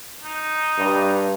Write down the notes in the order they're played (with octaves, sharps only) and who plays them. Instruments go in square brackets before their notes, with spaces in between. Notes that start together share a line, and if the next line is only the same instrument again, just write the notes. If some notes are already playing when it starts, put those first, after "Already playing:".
[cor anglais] D#4
[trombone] G2